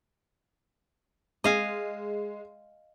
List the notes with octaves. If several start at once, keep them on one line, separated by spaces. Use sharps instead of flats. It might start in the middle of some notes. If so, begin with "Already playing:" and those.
G#3 D#5 F5 G#5